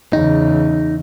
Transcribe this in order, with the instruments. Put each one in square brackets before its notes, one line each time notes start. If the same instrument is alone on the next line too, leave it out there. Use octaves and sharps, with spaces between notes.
[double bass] E2 C#3 [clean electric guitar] D#4